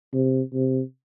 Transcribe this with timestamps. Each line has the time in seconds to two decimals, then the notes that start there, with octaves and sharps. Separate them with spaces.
0.14 C3
0.53 C3